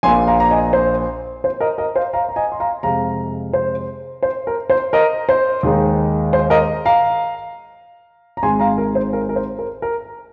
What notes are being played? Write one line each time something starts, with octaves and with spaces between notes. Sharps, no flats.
A#1 A#2 A#3 G#5 C6
F5 A#5
A#5
D#5 G#5
C5
C5
A#4 D#5
A#4 D#5
C5 F5
F5 A#5
A#5
D#5 G#5
C6
F5 A#5
F2 C3 G#3 F5 A#5
C5
C5
A#4
C5
A#4 D#5
C5
D#2 D#3 G#3 D#4
C5
A#4 D#5
F5 A#5
A#5
G#1 G#2 G#3 G#5 C6
F5 A#5
A#4
C5
A#4
A#4
C5
A#4
A#4